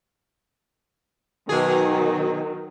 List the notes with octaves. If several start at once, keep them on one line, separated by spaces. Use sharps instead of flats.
B2 D#3 F#3 D#4 G#4